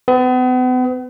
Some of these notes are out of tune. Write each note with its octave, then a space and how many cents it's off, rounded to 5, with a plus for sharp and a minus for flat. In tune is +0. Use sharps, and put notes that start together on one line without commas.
B3 +40